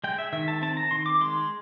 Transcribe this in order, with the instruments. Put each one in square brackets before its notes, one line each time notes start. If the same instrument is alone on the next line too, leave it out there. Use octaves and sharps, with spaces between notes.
[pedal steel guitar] G#3 G5
E5
D#3 E5
A5
C4 A5
A#5
D#3 C6
D6
G#3 C6